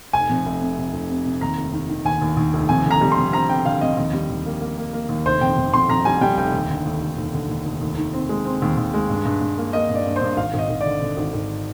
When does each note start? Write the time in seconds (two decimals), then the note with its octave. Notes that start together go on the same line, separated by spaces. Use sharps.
0.13 F1 G#5
0.30 F2
0.46 F1
0.61 C3
0.77 C3
0.93 F1
1.09 C3
1.25 C3
1.41 D#2 A#5
1.57 F1
1.73 D#3
1.89 D#3
2.05 D#2 G#5
2.22 D#2
2.37 D#2
2.53 F1
2.69 F2 G#5
2.85 D3
2.91 A#5
3.01 G3
3.12 C6
3.18 F2
3.33 C4 A#5
3.49 C4 G5
3.65 D3 F5
3.81 F2 D#5
3.97 D#2
4.13 G3
4.29 D#2
4.46 A#3
4.61 A#3
4.77 A#3
4.93 A#3
5.09 D#2
5.25 F1 C5
5.41 F2 G5
5.57 F2
5.73 F2 C6
5.89 F2 A#5
6.05 G3 G#5
6.21 G3 G5
6.37 F1 G5
6.53 D#2
6.69 D3
6.85 D#2
7.01 F1
7.18 D#2
7.33 D3
7.49 D#2
7.65 F1
7.81 D#2
7.97 D#3
8.13 C4
8.29 G#3
8.45 C4
8.62 D#2
8.77 D#2
8.94 G#3
9.10 G2
9.25 G2
9.41 G2
9.57 A#3
9.73 A#3 D#5
9.89 G2
9.95 D5
10.05 G2
10.16 C5
10.21 G2
10.37 G#1 F5
10.54 G#1 D#5
10.69 G#1
10.81 D3 D5
11.02 D3
11.17 G#1
11.34 G#1